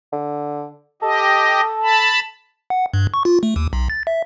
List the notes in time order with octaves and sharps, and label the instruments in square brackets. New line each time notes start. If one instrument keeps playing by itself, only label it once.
[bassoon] D3
[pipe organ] G4 D#5 [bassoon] A4
[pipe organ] A5 B5
[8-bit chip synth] F#5
G2
C#6
F4
A3
D#2
B1
A6
E5